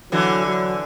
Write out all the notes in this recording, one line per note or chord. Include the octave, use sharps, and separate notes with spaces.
D3 E3 F#3
F#3